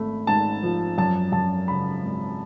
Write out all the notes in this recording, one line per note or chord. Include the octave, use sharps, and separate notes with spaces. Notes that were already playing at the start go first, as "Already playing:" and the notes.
Already playing: G#1 A3 B5
G#2 A5
F3
F#2 A5
F#2 A5
C#3 B5
G#1